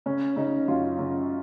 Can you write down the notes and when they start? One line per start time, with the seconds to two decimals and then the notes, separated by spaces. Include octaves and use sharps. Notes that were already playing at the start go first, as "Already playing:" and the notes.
0.06 C#3 C#4
0.36 C#3 D#4
0.68 F#2 F4
0.99 C#3